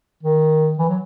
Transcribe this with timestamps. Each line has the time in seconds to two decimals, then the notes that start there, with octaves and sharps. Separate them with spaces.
0.23 D#3
0.78 E3
0.89 F#3